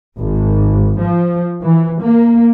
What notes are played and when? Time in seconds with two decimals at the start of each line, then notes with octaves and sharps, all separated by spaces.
0.19 G#1
1.00 F3
1.63 E3
2.01 A#3